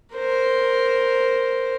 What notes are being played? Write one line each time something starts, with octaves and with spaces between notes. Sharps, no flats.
A#4 C5